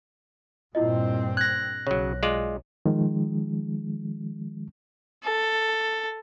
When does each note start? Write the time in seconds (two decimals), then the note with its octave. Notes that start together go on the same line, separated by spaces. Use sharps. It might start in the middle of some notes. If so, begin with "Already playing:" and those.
0.75 G2 A#2 C4 E4 F4 D#5
1.37 F#6 G#6 A#6
1.87 B1 C#3 F#3 C#5
2.23 G#3 F4 D5
2.86 D#3 F3 G#3
5.24 A4